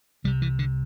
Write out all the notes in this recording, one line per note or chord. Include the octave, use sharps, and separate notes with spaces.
C2 C3 G3
E3
D3